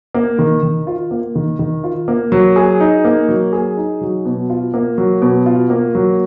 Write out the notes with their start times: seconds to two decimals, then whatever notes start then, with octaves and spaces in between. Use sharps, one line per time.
0.14 A#3
0.39 D#3
0.63 D#3
0.87 F4
1.11 A#3
1.35 D#3
1.59 D#3
1.84 F4
2.08 A#3
2.32 F#3
2.56 G#4
2.80 D#4
3.04 A#3
3.29 F#3
3.53 G#4
3.77 D#4
4.01 F#3
4.25 B2
4.50 F4
4.74 A#3
4.98 F#3
5.22 B2
5.46 F4
5.70 A#3
5.95 F#3